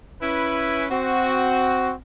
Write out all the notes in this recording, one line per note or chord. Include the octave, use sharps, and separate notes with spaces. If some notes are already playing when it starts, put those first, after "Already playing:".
C#4 E4 B4
C4 F#4